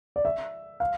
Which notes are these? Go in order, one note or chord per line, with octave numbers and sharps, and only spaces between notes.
D5
E5
F5